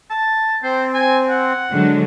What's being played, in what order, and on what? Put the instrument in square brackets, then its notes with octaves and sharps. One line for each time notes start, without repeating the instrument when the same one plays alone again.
[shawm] A5
[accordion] C4 [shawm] C5
[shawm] G#5
F#5
[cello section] D3 F#3 G#3